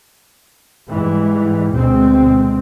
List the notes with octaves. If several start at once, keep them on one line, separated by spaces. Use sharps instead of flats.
G#2 E3 G3
D2 B2 G#3 C4